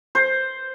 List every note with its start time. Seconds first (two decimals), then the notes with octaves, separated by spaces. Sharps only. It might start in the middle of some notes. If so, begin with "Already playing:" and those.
0.15 C5